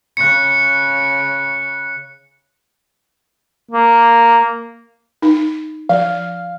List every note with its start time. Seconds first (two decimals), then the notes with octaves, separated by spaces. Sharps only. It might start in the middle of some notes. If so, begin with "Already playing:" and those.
0.17 C#3 F#6 C#7
3.71 A#3
5.22 D#4
5.89 F3 F5